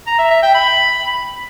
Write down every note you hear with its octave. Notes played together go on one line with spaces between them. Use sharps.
A#5
E5
E5
G5
B5